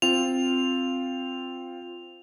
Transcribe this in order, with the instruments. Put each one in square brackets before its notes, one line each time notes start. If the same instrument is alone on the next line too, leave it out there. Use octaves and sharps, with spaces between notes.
[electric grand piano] C4 F4 [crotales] F7